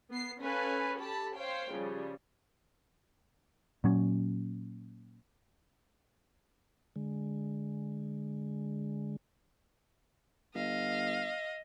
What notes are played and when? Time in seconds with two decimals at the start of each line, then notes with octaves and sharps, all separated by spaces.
0.10 B3 C7
0.42 C#4 A4 B4 F5 G#5
0.99 G4 A4 A5 B5
1.37 C5 C#5 F5 G5
1.71 C#3 F3 G3
3.84 A#2 F#3 C#4
6.96 D3 G#3
10.55 G1 D#5 F5